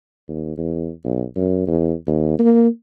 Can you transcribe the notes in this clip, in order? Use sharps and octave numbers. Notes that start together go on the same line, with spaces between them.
D#2
E2
B1
F#2
E2
D#2
A#3